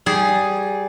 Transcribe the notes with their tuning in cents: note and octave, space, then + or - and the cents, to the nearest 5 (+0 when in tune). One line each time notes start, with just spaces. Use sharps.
G3 -15 G#4 +0